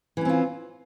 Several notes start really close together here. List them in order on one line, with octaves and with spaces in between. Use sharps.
E3 C#4 C4 F4